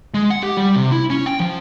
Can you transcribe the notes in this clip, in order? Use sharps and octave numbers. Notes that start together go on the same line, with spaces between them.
G#3
F#5
G4
G3
C3
E4
C#4
G5
F3